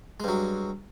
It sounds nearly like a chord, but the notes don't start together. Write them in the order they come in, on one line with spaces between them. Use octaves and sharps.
G#3 G2 F#3